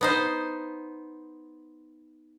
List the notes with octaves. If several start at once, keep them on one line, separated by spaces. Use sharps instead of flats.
B3 D#4 C5